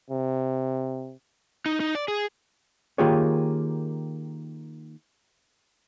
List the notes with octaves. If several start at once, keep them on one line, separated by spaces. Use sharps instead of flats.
C3
D#4
D#4
D5
G#4
D#3 A#3 F4 G4 G#4 C#5